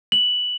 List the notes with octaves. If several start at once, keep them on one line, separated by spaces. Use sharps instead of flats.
F#7